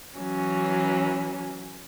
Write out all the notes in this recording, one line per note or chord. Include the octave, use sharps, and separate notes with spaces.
E3 F#3 C#4